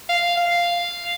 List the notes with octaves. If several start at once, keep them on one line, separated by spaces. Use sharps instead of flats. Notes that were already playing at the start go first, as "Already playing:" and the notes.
F5
F5